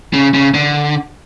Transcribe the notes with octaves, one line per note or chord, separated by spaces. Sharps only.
C#3
C#3
D3